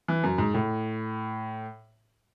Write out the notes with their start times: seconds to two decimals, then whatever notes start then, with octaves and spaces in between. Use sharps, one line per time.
0.08 E3
0.24 F#2
0.38 G#2
0.54 A2